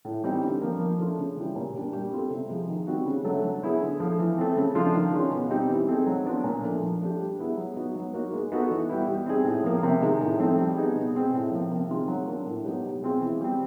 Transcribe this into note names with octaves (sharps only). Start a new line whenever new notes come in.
A2
E3 G3 C4 D#4
D3
F3 A#3
F3
A3 D4 F4
C#3
E3 G3
A#2
G3 A#3 D4
G3
C4 F4 A4
C3
F3 G#3
D#3
G3 C4 D#4 F#4
C#3
F#3 A3 D4
F#3
B3 E4 G#4
D3
F3 A3
E3
A3 C4
C#3
F3 A3 D4 F4
D#3
G#3 C#4 F4
B2
G3 C4 D#4 G4
E3
A3 C4 D#4 G#4
F#3
B3 D4 F4
A#2
F3 A3 D4
F3
A3 D4 G4
G3
B3 E4 G#4
F#3
B3 D#4 F#4
F#3
A#3 D#4 F#4
G#3
B3 D#4 F#4 A4
E3
G3 B3 E4
G3
C4 D#4 G#4
A2
F3 A#3
C3
D#3 G#3
A2
F3 A3 C4 D#4
G3
B3 D#4 G#4
B2
G#3 C4
A2
F3 A#3
C3
D#3 G#3 C4 F4
F#3
A#3 D4
A2
F#3 B3 D#4 G4
B2
G#3 C4 F4 G#4
E3
G3 C4